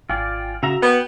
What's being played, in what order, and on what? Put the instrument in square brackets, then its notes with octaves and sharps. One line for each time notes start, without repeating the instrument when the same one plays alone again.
[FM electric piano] G#1 G5 G#5 [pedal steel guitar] F4 D5
[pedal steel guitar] C#3 E5 A#5 [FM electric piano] F#4
[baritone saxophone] B3 [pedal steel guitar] F#5 G5